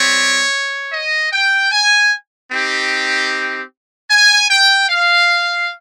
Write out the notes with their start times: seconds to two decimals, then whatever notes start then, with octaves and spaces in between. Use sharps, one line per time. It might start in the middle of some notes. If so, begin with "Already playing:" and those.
Already playing: G3 C4 G4 C#5
0.91 D#5
1.32 G5
1.71 G#5
2.50 C4 D#4 G4
4.09 G#5
4.49 G5
4.88 F5